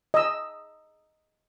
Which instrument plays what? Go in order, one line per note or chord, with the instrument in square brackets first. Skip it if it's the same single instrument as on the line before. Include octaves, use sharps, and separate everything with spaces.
[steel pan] D#5 E6